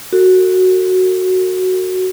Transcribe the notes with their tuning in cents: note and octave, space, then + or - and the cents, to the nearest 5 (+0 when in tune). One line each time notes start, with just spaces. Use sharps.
F#4 +0 A4 +45